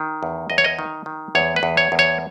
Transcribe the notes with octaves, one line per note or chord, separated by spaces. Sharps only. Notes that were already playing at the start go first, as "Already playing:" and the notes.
Already playing: D#3
E2
E2 D#5
C#5
D#5
D#3
D#3
E2 C#5
B4
E2
C#5
E2
C#5